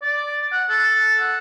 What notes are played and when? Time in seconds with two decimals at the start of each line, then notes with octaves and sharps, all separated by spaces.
0.02 D5
0.52 F#5
0.69 A4
1.20 F#5